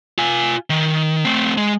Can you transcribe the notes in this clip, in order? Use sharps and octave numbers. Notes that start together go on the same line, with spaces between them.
F4 G#5
D#3
A3 C4
G#3